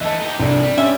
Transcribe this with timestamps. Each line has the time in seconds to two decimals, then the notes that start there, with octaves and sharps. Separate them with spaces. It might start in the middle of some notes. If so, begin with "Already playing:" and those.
0.01 E3 A3 D#5 A5
0.21 D#4 G4
0.40 C2 F2 A2 D4
0.63 G3 D4
0.78 C#4 E5